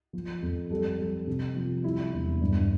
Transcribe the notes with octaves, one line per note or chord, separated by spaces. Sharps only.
F3
F2
G3 A4
G3
C3
F3
G3 E4
E1
G2